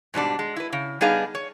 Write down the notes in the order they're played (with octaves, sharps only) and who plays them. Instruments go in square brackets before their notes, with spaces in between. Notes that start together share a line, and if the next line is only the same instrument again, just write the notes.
[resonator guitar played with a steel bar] G#2 B2 G3 D4
G#3
E4 B4
C#3
G3 B3 D4 D#4 G#4 F5
C#5